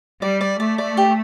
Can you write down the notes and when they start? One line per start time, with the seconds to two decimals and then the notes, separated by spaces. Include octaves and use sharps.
0.21 G3 D5
0.41 D5
0.59 A3 D5
0.78 D5
0.97 G4